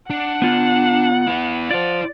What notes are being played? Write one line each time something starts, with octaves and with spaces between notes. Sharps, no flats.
D4 F#5
B3 F4
B3 E4
F4 C5 D5